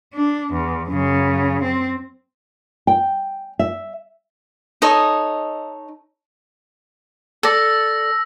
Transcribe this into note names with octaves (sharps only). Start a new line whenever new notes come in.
D4
E2
F#2 C#3
C4
G5
E5
D#4 A4 C#5 D#5
A4 D5 E6 A#6